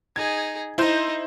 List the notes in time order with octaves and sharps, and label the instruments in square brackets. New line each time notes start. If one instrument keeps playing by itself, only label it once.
[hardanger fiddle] D#4 G#4 [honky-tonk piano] G#6
[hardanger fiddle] D#4 [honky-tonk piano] E4 C5 G6